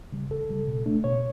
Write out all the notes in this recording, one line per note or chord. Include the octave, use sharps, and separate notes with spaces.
C#3 G3
E2 A4
C#3 G3
B2
A3 D4
B2 C#5